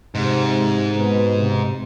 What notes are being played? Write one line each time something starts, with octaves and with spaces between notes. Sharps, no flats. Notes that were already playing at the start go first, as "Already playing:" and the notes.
G#2 C3
B2
C3